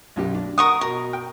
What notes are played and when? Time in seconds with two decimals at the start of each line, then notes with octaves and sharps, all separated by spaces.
0.16 B1 F#2 G4
0.35 D4
0.58 A#4 F#5 C#6 D#6
0.81 B2 A#4
1.13 G5